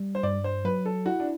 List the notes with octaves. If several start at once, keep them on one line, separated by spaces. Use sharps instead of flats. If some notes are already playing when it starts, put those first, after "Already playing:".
Already playing: G3
C5
G2 D5
C5
F#3 B4
A4
E4 F#4
D4